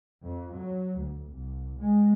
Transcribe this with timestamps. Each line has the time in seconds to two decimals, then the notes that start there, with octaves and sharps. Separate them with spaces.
0.23 F2
0.55 F#3
0.97 D2
1.31 C2
1.77 G#3